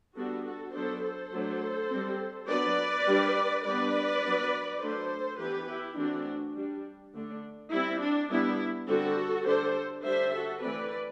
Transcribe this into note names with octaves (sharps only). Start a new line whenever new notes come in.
G3 B3 D4 F#4 A4
F#4 A4
F#3 B3 D4 A4 C5
A4 C5
F#3 A3 D4
G3 C4
F#3 B3 D4 B4 D5
G3 D4
G3 B3 D4 B4 D5
F#3 B3 D4
F#3 A3 D4 A4 C5
E3 B3 D4 G4 B4
E4 G4
E3 A3 C4 D4 F#4
G3 D4
D3 A3 D4
G3 C4 E4
D4
G3 B3 D4 E4
D3 G3 C4 F#4 A4
D3 G3 D4 A4 C5
D3 G3 D4 C5 E5
F#4 A4
E3 A3 C4 B4 D5